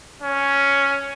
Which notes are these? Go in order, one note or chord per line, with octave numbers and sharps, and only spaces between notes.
C#4